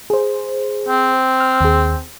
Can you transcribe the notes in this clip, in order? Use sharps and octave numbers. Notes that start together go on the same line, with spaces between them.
G#4 C5
C4
F6
D#2 G#4